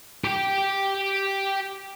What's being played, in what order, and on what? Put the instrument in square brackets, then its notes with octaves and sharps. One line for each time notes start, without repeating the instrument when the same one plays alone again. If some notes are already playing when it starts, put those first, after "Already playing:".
[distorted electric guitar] G4 G5